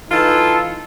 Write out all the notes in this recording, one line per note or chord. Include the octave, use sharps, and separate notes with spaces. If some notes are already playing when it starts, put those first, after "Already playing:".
E3 D#4 F4 A4